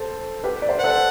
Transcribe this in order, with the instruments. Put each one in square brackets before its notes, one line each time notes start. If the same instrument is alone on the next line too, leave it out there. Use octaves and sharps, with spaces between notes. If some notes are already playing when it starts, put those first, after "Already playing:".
Already playing: [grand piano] A4 C5
G4 B4
D5
C5
B4
[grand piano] A4 C5 [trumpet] F#5